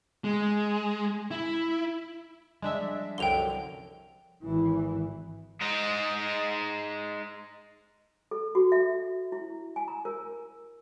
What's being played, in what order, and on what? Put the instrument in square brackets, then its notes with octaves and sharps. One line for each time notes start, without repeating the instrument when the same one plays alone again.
[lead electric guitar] G#3
E4
[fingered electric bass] F3 G3 [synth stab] G#3 D4 E5
[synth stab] C2 F#2 D3 [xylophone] G5 F7 G7
[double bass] G#1 E3 [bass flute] E4
[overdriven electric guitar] G#3 D#4
[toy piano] A4
F#4
E5
E4
G#5
A#5
A#4